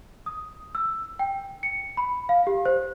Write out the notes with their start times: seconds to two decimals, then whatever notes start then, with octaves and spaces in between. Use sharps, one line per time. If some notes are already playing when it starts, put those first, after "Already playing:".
0.26 D#6
0.75 E6
1.19 G5
1.63 C#7
1.97 B5
2.29 F5
2.47 G4
2.66 C5